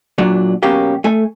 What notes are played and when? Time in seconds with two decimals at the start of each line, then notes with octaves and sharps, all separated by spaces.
0.18 A#2 F#3 D4
0.63 F#2 B2 F#3 A#3 C#4 G4
1.04 A3 A4 G#5